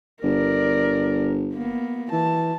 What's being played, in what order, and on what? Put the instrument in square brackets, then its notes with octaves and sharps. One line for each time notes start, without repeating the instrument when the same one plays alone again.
[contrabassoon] G1 [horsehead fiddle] A#4 D5
[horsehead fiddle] A#3 B3
[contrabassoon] E3 [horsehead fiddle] A5